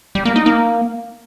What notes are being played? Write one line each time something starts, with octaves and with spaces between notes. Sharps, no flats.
G3
A#3
D#4
A#3